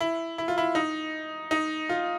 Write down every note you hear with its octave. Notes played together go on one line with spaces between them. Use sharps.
E4
E4
F4
E4
D#4
D#4
F4